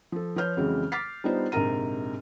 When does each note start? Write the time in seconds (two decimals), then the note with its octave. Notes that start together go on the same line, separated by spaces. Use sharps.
0.12 F3 A4
0.36 F3 B4 C#5 F6 G6
0.57 F2 C#3 E3 F#3 G#3
0.92 D6 F6 A6 B6 C7
1.24 G3 B3 D4 D#4 F4 C5
1.52 A#1 G#2 C3 A#4 A#5 D#7